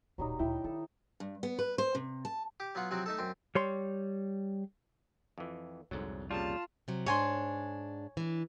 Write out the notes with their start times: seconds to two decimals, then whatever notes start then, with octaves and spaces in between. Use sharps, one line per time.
0.18 D#1 A#2 F#3 G3 D#4
0.39 D2 A#2 E4 G5
0.64 D#3 A4
1.20 G2
1.43 B3
1.59 B4
1.78 C5
1.95 C3
2.25 A5
2.60 G4 D6
2.75 F#3 B3 F4 F#5
2.91 C3 F3 F#3 C4 F#4
3.06 A3 D#4 A4
3.18 F#2 C4
3.55 G3 C#5 C6
5.38 F2 E3
5.91 C2 F2 G#2 D3 F#3
6.31 A#2 C#3 G3 F4 A5
6.88 C3 F#3
7.06 G#2 D4 C#5 G#5 C6
8.17 E3 D4